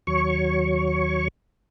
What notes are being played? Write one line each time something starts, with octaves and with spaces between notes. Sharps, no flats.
D#2 F#3 C#5 C#6